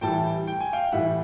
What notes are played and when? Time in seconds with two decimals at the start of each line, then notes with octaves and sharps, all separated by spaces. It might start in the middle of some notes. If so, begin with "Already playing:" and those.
0.01 A2 E3 G3 G5 A5
0.47 G5
0.60 G#5
0.73 F5 G5
0.92 A2 E3 G3 E5 F#5